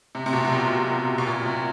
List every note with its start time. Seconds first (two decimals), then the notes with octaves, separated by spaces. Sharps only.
0.15 C3
0.26 C3
0.33 B2
0.45 B2
0.52 A#2
1.18 B2
1.27 A#2
1.46 C3